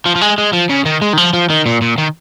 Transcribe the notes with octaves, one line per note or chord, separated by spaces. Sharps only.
F3
F3
G#3
G#3
F3
C#3
D#3
G#3
D#3
F3
F3
D#3
A#2
A#2
D#3